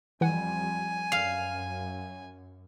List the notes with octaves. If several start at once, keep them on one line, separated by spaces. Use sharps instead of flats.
F2 E3 G3 F#5 G#5
F#2 F5